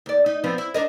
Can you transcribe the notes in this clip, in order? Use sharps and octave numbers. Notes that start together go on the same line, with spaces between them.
D#2 D5
D#4
F3 B3 C4
E4
D4 A#4 D#5